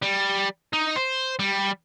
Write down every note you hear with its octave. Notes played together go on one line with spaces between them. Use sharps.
G3
D#4
C5
G3